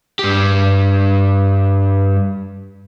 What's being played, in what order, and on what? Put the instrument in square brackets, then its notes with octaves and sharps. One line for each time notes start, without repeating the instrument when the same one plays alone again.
[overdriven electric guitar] G2 G4